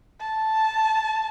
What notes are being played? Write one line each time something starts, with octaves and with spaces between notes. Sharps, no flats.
A5